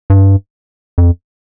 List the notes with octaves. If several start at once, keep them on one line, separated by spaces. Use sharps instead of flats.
G2
F2